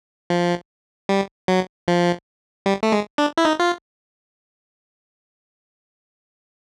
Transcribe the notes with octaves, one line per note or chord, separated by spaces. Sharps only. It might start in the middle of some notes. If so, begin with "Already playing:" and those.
F3
G3
F#3
F3
G3
A3
G#3
D4
E4
D#4
F4